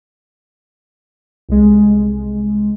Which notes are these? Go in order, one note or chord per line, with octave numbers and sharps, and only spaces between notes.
C2 G#3